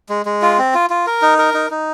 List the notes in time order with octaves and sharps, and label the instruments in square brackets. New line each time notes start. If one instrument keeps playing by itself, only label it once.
[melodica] G#3
G#3
F4
C4
F4
F4
A#4
D#4
A#4
D#4
D#4